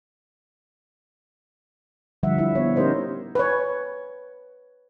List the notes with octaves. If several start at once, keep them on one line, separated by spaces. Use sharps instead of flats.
D3 F3 G3 E5 F#5
E4 E5
B3 C#5
C#4 D#4 G4 A#4 C5 D#5
B4 C#5